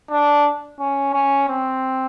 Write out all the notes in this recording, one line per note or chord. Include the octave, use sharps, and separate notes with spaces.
D4
C#4
C#4
C4